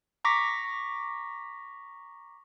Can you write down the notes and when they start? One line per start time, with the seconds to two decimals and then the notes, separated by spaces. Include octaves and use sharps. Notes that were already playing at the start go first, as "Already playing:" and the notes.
0.25 A#5 C#6 D6 A#6 B6